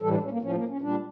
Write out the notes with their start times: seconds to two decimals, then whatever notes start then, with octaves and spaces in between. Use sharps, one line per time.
0.02 A2 E3 G3 A4
0.12 D4
0.22 C#4
0.31 A#3
0.42 A2 F3 C#4
0.55 A#3
0.68 C#4
0.81 A#2 G3 D4